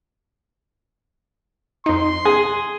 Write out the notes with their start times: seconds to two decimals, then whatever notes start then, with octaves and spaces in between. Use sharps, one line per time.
1.86 F2 D#4 C6
2.25 G#4